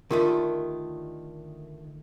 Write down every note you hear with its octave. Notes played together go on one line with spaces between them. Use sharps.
D3 D#3 A3 F4 G4 A#4